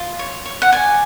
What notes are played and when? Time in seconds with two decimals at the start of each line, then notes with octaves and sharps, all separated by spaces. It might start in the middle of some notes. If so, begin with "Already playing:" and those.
Already playing: F4
0.19 C#5
0.45 C#5
0.62 F#5
0.72 D5 G#5